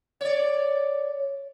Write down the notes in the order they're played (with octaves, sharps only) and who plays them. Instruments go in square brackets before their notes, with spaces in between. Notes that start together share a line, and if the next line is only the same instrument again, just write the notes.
[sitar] C#5 D5